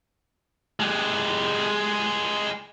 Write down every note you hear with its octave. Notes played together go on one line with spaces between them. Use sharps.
G#3 G4